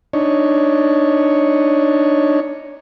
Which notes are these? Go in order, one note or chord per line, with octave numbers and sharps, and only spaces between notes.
D4 D#4 C#5